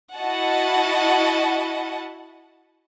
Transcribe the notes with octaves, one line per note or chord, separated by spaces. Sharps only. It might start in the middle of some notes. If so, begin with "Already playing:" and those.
E4 F#4 D#5 F#5 A5